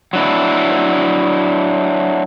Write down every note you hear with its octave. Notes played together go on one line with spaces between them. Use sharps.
F#3 D4 E4